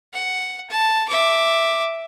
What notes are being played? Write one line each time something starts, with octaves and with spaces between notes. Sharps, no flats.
F#5
A5
E5 D6